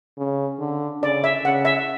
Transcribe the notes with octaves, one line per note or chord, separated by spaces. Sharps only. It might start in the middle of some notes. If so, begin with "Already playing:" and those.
C#3
D3
C#3 D5
E5
C#3 F#5
E5